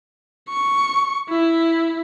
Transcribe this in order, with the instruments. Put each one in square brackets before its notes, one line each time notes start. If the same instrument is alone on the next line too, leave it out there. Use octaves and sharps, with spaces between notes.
[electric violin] C#6
E4